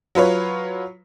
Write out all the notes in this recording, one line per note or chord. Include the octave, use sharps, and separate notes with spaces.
F#3 F4 B4 C#5